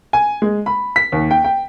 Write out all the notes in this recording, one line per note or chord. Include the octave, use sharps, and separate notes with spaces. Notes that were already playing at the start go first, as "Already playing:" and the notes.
G#5
G#3
B5
B6
D#2
G5
G5